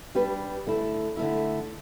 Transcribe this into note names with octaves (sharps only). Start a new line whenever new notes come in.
G3 D4 G4 B4
D3 A3 E4
D3 A3 E4